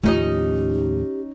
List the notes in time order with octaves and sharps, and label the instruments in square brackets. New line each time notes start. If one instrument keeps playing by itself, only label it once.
[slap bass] D#2 A2 F3 [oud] C#4 D#4 D#5 [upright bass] F4 [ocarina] G4